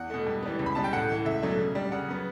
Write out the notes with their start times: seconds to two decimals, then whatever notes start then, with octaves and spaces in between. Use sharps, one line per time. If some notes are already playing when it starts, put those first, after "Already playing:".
Already playing: E2 F#5
0.10 B2 A3
0.27 G2
0.43 E3 G3 B3
0.59 C#2
0.66 B5
0.75 B2 G3 A5
0.84 G5
0.92 A2 F#5
1.09 E3 A3
1.25 C#2 E5
1.42 B2 F#3 A3 D4
1.58 C#3
1.75 G3 D4
1.92 C#3 F#5
2.08 F#3 B3